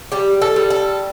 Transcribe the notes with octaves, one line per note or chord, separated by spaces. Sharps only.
G3 G4
A4
G3
A4